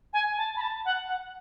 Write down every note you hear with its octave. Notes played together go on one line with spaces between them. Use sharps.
G#5
A5
B5
A5
F#5
F#5